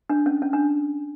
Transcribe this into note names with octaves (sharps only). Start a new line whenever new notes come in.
D4
C#4
C#4
D4